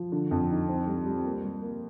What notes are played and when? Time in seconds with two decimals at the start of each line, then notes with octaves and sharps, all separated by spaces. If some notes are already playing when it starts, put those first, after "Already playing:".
Already playing: F3
0.12 D3
0.31 F2
0.50 D#4
0.68 C4
0.87 G3
1.06 G3
1.25 A#3
1.44 G3
1.62 A#3